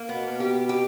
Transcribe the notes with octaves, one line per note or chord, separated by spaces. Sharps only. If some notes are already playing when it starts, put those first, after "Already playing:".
Already playing: A#3
B2 B3
G4
G4